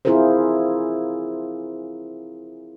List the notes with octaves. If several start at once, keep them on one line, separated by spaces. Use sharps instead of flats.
C4 E4 F4 G#4 A#4 C5